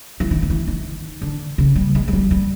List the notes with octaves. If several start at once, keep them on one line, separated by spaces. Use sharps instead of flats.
E3
D#3
D#3
E3
D#3
D3
C#3
G3
G#3
G#3
G3
G3